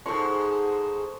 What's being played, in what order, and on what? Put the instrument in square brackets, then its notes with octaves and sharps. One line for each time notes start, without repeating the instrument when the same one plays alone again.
[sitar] G#2 G#3 [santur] A4 C5 C#6